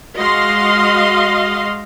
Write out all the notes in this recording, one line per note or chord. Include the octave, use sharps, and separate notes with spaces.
G#3 F#4 D#5 F5 C6